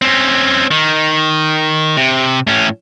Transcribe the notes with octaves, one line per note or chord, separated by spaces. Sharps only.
C4 C#4
D#3
C3
A2 C#4